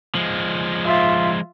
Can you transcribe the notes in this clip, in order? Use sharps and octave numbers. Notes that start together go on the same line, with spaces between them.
F3 G#3
F4 E5